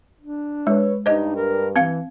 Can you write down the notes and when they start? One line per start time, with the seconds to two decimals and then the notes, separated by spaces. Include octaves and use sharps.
0.21 D4
0.67 G#3 B4 C#5
1.06 G2 D#4 C5 D#5
1.36 A#4
1.76 E3 C4 F5